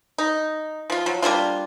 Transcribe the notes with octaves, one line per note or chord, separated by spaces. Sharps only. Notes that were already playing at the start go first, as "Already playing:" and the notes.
D#4
F3 F4
F3 F#3
G3 A#3 D4 F4